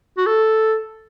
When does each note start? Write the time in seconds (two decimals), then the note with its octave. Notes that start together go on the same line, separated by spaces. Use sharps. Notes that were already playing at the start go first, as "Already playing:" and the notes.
0.18 F#4
0.26 A4